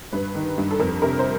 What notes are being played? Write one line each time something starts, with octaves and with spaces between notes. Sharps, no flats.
G2 B4
D#3
G2
A4
F2 A#4
C3 A#4
C5